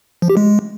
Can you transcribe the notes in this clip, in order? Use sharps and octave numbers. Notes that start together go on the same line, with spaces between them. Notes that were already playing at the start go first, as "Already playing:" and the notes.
F3
G4
G#3